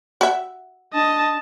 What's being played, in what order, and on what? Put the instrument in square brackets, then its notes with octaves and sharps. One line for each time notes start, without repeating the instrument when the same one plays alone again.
[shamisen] F#4 E5
[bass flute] D4 [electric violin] D#5 A5